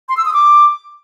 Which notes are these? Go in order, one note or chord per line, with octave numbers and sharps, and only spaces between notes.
C6
E6
D#6
D6